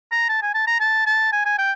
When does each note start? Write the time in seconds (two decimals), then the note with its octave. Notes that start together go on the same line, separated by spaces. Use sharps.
0.12 A#5
0.29 A5
0.42 G#5
0.54 A5
0.67 A#5
0.80 A5
1.06 A5
1.33 G#5
1.45 G#5
1.58 G5